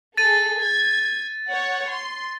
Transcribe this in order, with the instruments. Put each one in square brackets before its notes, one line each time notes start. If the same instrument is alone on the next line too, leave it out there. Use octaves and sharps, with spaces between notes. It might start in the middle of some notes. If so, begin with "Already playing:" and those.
[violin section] G#4 A4 [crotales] A6 D#7
[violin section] G#6
C#5 F#5
C6